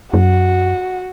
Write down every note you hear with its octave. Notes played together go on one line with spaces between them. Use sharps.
F#2 F#4